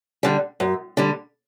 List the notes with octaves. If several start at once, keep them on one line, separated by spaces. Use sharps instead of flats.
D3 G3
F#2
D3 G3